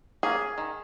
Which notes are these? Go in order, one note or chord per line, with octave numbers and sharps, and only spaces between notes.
A#3 C#4 G#4
D#3